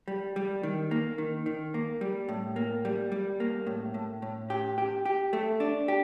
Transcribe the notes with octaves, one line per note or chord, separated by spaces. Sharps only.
G3
G3
D#3
A#3
D#3
D#3
A#3
G3
A2
A#3
G3
G3
A#3
A2
A2
A2
G4
G4
G4
A3
D4
G4